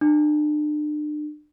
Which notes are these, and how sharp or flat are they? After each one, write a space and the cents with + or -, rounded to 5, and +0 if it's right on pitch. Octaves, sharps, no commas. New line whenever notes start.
D4 +40